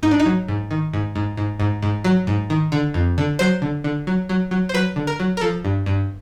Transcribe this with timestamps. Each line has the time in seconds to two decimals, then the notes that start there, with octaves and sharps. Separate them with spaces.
0.03 G#2 D#4
0.11 D4
0.20 D#4
0.26 F#3
0.48 G#2
0.71 D#3
0.93 G#2
1.15 G#2
1.37 G#2
1.60 G#2
1.82 G#2
2.04 F#3
2.27 G#2
2.50 D#3
2.72 D3
2.94 F2
3.18 D3
3.39 F#3 C5
3.62 D3
3.84 D3
4.07 F#3
4.29 F#3
4.51 F#3
4.69 C5
4.74 F#3 B4
4.96 D3
5.07 A#4
5.20 F#3
5.37 A#4
5.41 F3 A4
5.65 G2
5.86 G2